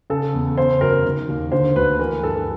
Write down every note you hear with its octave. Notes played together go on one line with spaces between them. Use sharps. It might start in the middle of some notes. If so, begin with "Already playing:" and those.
C#3 A4
E2
C#3 C5
F#2 A#4
D#3
D#2
D3 C5
D2 B4
E3 A#4
G2 A4